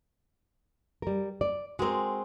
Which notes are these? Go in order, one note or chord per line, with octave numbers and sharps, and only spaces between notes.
G3 A#4
D5
G#3 C4 F#4 A#4